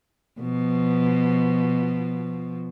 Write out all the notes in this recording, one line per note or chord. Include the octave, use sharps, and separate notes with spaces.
B2 F3